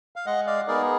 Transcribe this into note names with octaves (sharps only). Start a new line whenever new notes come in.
F5
G#3 D#5 F#5
D5 F5
B3 D#4 G#4 A#4 D5